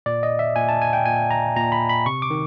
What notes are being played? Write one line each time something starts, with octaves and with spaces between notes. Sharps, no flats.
A#2 D5
D#5
E5
A#2 G#5
A5
G#5
G5
A#2 G#5
A#5
A#2 A#5
B5
B5
C3 C#6
D6
D#3